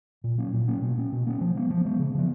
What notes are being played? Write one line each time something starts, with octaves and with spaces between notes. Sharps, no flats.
A#2
F#3 A#3 C#4
A#2
F#3 A#3 C#4
B2
A#3 C#4
B2
A#3 C#4
F3
G#3 B3
F3
G#3 B3
C#3
F3 B3